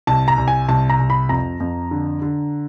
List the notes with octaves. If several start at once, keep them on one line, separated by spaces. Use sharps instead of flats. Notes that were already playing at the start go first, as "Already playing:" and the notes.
C2 A5
A#5
C2
G#5
C2 A5
A#5
C2
B5
F2 A#5
F2
D3
D3